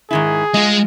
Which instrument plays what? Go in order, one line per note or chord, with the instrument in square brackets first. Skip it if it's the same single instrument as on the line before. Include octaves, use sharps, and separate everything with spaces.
[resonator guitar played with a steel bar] G#2 D#3 E4 [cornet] G#4
[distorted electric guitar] G#3 [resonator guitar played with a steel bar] F4 D#5